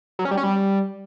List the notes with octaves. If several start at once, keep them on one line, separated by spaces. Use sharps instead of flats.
F#3
C#4
G3
C#4
G3